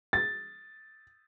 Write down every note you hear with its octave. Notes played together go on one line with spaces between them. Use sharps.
A6